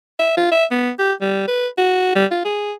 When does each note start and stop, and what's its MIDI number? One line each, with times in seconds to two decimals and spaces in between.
0.19 0.36 76
0.37 0.47 65
0.52 0.65 76
0.71 0.90 59
0.99 1.13 67
1.21 1.47 55
1.48 1.68 71
1.78 2.11 66
2.16 2.25 55
2.31 2.42 65
2.45 2.73 68